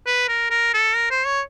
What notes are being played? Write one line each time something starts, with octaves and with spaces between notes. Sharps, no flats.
B4
A#4
A#4
A4
A#4
C5
C#5